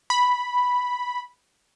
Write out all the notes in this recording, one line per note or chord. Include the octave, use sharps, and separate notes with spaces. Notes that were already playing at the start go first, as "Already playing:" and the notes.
B5